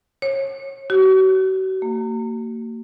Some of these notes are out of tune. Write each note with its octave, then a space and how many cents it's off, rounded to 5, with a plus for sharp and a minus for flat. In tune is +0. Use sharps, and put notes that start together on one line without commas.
C#5 -30
F#4 +40
A#3 -35